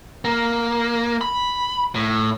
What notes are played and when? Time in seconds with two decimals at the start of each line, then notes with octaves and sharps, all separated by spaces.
0.25 A#3
1.21 B5
1.95 A2